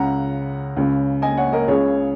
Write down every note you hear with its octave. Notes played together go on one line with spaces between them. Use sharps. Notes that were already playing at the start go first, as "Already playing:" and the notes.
Already playing: C#2 C#3 F#5 A#5
C#2 C#3
D#5 G#5
C#5 F#5
A#4 D#5
C#2 C#3 G#4 C#5